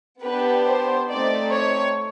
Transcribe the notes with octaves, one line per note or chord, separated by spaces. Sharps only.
B3 D4 G4 B4
C5
A3 C4 D#4 D5
C#5